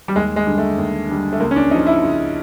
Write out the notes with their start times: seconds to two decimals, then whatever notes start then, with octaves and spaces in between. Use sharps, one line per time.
0.08 G3
0.15 D#2 G#3
0.36 G#3
0.46 D3 G3
0.58 A3
0.78 D#2
1.09 D3 G3
1.32 A3
1.40 C#2 A#3
1.51 C#4
1.56 D4
1.71 C#3 F3 D#4
1.87 E4
2.03 C#2